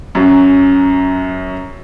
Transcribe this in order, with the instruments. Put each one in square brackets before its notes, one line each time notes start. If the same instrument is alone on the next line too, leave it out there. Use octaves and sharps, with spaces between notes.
[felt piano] F#2 F#3